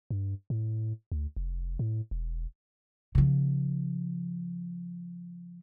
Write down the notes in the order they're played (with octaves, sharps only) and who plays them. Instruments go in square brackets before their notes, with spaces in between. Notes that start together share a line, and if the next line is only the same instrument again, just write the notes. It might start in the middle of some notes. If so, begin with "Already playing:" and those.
[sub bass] G2
A2
D2
F1
A2
E1
[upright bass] C#3 F3